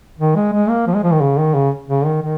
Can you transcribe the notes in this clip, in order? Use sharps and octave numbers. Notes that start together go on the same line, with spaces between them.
D#3
G#3
G#3
A#3
F3
G#3
F3
D#3
C#3
D#3
C#3
C#3
D#3
D#3